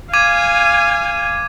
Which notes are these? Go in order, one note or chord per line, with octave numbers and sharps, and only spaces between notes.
F5 G#5 D6 G#6 D#7